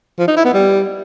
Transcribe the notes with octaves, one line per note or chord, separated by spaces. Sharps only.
F3
D#4
E4
B3
G3